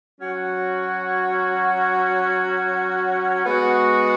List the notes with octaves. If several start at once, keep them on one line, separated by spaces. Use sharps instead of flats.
F#3 C#4 F#4
G#3 B3 F#4